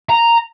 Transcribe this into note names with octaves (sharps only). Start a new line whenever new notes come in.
A#5